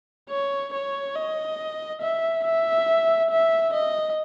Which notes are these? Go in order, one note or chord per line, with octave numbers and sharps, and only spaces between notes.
C#5
C#5
D#5
E5
E5
E5
D#5